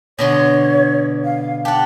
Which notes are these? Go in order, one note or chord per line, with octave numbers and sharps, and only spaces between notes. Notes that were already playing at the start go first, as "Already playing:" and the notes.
B2 D3 C#5 C6
F5
G4 F#5 A5